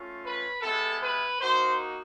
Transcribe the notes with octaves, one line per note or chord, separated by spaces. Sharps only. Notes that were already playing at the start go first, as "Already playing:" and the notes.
Already playing: A3 C#4 F4
B4
G#3 B3 E4 G4 A4
B4
A#3 D#4 F#4 C5